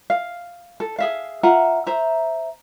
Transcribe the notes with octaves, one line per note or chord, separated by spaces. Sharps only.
F5
A4
G#4 E5 F5
F4 E5 F#5 A#5
C5 E5 A#5